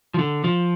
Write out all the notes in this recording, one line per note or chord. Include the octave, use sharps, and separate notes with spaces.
F3
D3
F3